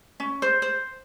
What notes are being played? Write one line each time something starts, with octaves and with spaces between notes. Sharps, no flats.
C#4
C5
C5